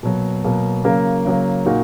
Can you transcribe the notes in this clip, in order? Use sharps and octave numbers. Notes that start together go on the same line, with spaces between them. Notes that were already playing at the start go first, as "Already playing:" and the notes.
B2 F#3 A#3
B2 F#3 A#3
C#3 F#3 A#3
C#3 F#3 A#3
A#2 A#3 D#4 F#4